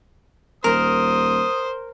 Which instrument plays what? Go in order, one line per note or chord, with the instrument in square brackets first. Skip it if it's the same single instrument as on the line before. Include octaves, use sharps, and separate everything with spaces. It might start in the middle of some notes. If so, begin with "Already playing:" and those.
[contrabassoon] D#1 [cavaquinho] A#4 [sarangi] C5 [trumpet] D#6